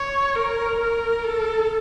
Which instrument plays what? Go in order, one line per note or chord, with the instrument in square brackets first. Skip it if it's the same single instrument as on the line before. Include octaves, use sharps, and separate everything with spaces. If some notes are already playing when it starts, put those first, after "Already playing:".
Already playing: [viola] C#5
A#4
A#4
A4